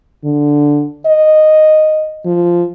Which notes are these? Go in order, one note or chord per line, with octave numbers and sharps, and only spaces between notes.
D3
D#5
F3